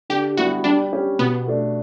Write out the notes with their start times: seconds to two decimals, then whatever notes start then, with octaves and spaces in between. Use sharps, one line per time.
0.10 D3 G4
0.37 G3 B3 E4 F#4
0.64 G3 D4
0.92 C#4 G4
1.19 B2 B3
1.47 A3 D4